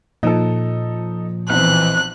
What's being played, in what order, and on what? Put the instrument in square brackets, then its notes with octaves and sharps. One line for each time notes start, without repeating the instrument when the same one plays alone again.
[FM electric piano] A#2 F3 [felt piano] D#4 A4
[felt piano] B1 C4 [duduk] E3 [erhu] F#6